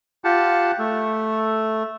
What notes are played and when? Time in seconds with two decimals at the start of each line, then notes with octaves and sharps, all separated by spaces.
0.24 F4 G4 F#5 A5
0.79 A3